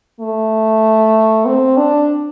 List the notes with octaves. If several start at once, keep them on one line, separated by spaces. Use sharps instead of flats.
A3
C4
D4